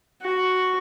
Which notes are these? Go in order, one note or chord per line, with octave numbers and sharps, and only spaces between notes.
F#4